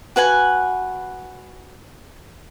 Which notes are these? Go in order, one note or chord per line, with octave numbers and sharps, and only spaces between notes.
F#4 B4 F#5 G#5